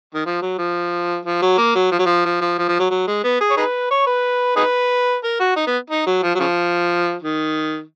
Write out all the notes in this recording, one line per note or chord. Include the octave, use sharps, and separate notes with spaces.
D#3
F3
F#3
F3
F3
F#3
A#3
F#3
F3
F#3
F3
F3
F3
F3
F3
F#3
F#3
G#3
B3
G#4
C#5
D#4 G#4 B4
C#5
B4
D#4 G#4 B4
A#4
F#4
D#4
B3
D#4
F#3
F3
F#3
C#3 F3
D#3